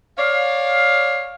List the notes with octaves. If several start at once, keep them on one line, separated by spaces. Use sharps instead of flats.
C#5 D5 F5